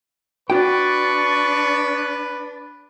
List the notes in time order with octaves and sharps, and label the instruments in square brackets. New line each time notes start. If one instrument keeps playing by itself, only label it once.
[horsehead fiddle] D4 [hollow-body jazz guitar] F#4 G5 [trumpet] B4 [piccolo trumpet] C#6